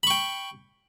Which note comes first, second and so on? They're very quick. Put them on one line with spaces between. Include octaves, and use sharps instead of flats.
B5 C#6 G5